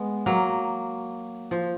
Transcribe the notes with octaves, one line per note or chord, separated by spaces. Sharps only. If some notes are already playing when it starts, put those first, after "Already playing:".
Already playing: G#3 B3
F#3 A#3
F3